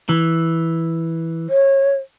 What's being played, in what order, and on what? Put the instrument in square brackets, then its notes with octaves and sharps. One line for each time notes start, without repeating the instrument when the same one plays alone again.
[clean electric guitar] E3
[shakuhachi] C#5